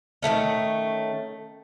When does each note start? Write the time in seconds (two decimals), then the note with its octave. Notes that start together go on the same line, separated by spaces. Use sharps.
0.22 D#3 G3 A3 C#4